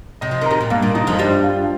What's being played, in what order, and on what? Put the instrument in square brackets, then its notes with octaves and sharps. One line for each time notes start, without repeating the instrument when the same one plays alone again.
[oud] C3 [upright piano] D#5
[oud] F3
[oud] D#3 [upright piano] A#4
[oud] C3
A#2
[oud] G2 [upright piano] A#3
[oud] A#2
[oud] C3 [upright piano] D#4
[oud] F2 F3
[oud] G2 G3 [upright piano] C5
[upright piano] F4